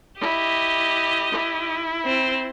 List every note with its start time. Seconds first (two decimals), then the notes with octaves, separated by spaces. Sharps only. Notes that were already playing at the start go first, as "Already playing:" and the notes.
0.21 E4 G4 D#5
1.31 E4
2.05 C4